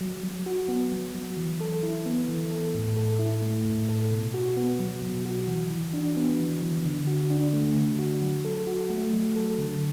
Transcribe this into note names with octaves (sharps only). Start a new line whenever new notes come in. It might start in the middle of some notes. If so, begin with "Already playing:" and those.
F#3
F#3
F#4
B3
F#3
F#3
E3
A4
E4
B3
E3
A4
A2
A4
E4
A3
A2
A4
B2
F#4
B3
F#3
B2
F#4
E3
E3
D4
B3
E3
E3
D3
F#4
D4
A3
D3
F#4
F#3
A4
F#4
A3
F#3
A4
D3